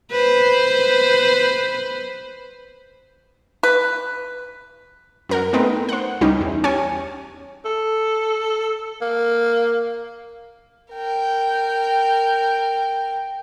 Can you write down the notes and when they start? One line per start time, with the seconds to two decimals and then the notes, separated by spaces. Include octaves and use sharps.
0.11 B4 C5
3.63 B4
5.29 F#2 A#4 F#5
5.53 A3 B3 C4 D#4 A#4 B4
5.89 C5 F#5
6.21 C#2 G3 C#4 D#4
6.41 E2
6.64 C#4 G4 C#5 G#5 A5
7.65 A4
9.02 A#3
10.92 A#4 G5